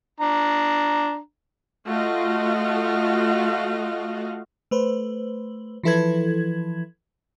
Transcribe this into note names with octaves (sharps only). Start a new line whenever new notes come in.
D4 A#5
A3 F4 F#4 D#5 F5
A3 B4 C5
E3 F3 E4 A4 B4 G#6